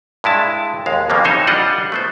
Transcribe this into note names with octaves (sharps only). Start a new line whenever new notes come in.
G2 G#3 E4 A5
D#2 G#3 F5
F2 C#3 G3 G#3 A#3 B3
E3 C4 D#4 C5 C#5 D#5
G3 D4 F4 D#5 F#5
A3 B3 C5